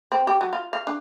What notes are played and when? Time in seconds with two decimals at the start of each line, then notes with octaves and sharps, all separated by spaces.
0.12 C4
0.27 G4
0.41 F#3
0.53 F4
0.73 F5
0.87 D4